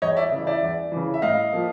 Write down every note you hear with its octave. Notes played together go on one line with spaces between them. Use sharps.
E2 C#5 D#5
D5 E5
C#3 E3
D5 E5
E2
C#3 E3
E5
A2 D#5 F5
F3 A#3